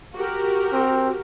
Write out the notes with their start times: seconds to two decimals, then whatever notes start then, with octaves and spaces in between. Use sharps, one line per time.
0.14 F#4 G4 A#4
0.73 C4